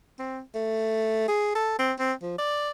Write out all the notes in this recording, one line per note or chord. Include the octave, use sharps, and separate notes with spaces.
C4
A3
G#4
A4
C4
C4
F3
D5